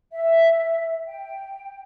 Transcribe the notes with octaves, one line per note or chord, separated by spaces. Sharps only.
E5
G5